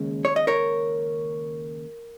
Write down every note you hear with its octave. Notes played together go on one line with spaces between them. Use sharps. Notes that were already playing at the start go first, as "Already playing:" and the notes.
Already playing: D#2 C#3 G#3
C#5
D#5
A#4 C#5